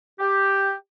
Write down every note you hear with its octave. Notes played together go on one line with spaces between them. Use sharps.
G4